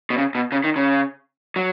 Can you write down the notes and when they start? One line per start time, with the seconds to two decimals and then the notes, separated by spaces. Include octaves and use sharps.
0.10 B2
0.18 C#3
0.35 B2
0.52 C#3
0.64 D#3
0.76 C#3
1.56 F#3